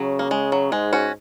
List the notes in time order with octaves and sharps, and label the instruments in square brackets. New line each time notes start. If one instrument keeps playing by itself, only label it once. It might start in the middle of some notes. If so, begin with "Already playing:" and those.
Already playing: [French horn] C#3 [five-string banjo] F#3
[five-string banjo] A#3
G#3
F#3
[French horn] G#2 [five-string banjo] G#3
[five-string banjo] C#4 F#4